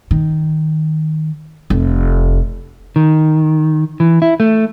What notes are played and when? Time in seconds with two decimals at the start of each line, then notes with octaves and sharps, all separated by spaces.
0.11 D#3
1.70 F1
2.96 D#3
4.00 E3
4.22 E4
4.40 A3